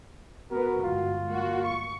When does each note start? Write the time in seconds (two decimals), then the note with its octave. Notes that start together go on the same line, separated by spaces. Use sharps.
0.51 B3 F#4 A#4 B4
0.83 G1 G#2 F4
1.29 A#3 F#4
1.66 C#6